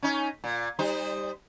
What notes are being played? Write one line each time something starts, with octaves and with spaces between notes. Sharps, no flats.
C#4 D#4
A#2
G3 D#4 C5